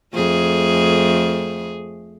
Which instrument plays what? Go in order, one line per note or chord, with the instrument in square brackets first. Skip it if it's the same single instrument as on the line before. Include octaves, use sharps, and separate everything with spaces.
[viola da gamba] F2 A3 G#4